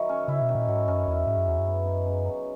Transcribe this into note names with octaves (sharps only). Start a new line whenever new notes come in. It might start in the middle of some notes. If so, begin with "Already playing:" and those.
Already playing: D#3 F#3 E4
C#4
C#3 E4
B2
D#3
A#2
G#2 F#3
F#2 C#4
E2 E4
G#2 C#3
F#2
E2 F#3
F#2
B3
D#4
C#3
F#3